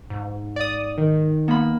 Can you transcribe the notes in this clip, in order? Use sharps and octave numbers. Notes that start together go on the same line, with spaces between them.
G#2
D5 D#6
D#3
A#3 B3 B5